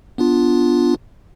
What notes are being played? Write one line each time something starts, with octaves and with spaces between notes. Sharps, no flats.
B3 D4 F4